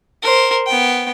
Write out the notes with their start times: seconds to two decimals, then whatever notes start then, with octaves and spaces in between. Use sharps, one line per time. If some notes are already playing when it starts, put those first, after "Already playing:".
0.23 A#4 C5
0.67 B3 G5